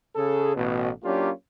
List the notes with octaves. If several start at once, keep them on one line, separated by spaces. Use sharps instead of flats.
C#3 G#4 A4
A1 B2
F#3 A#3 C#4 D4 F4 G4